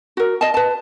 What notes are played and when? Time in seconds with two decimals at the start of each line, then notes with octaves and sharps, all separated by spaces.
0.17 F#4 A#4
0.41 D#5 A5
0.54 B4 A5